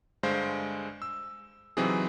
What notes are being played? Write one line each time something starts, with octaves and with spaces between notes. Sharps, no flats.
G2 D3 G#3 C5 F5 G#5
E6
C3 E3 F#3 C4 D#4 G#4